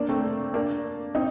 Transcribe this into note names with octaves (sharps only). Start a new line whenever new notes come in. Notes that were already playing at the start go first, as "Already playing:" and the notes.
Already playing: A#3 D4
A3 C4
A#3 D4
C4 D#4